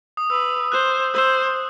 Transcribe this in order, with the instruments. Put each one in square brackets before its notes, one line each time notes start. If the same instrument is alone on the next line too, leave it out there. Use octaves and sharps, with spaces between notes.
[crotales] D#6
[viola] B4 [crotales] E6
[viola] C5 [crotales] F#6
[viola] C5 [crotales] E6